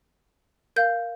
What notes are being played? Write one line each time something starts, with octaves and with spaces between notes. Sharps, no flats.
A#4 F5 G6